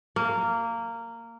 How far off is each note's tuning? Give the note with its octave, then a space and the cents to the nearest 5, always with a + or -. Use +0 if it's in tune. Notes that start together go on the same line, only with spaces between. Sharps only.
A#3 -15